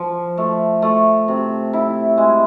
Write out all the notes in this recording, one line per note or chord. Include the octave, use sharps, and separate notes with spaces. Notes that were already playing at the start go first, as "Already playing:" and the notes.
Already playing: F3
A3
A3
C3
E4
G#3